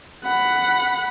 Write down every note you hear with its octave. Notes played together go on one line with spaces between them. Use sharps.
F#5 B5